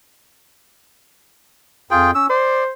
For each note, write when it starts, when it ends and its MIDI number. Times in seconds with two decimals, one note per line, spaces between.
1.91 2.12 41
1.91 2.11 65
1.91 2.11 68
1.91 2.11 79
2.15 2.26 61
2.15 2.26 88
2.29 2.71 72
2.29 2.64 74